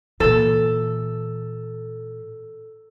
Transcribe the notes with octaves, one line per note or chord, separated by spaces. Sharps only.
A#2 E3 A4